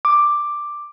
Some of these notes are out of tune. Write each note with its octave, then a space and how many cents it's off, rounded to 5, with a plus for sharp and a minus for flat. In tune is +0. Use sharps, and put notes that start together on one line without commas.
D6 +5